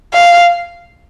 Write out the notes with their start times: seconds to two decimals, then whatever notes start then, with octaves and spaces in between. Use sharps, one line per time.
0.14 F5